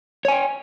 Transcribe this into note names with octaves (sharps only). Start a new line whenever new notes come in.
C#5 G5 G#5